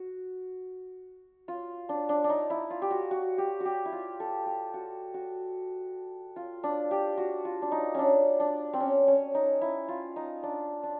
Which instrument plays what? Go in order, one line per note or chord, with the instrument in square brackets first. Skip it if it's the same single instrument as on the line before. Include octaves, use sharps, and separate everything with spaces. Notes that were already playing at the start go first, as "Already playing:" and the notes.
Already playing: [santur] F#4
F4
D4
D4
D4
D#4
E4
F4
G4
F#4
F#4
G4
F#4
G4
E4
F4
A4
G4
F#4
F#4
F4
D4
G4
F#4
F4
D4
D#4
C#4 D4
D4
C4
C#4
C#4
D#4
E4
F4
D#4
D4
D4